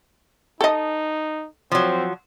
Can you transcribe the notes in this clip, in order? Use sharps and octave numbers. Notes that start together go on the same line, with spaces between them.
D#4 A4 D#5
F3 F#3 C4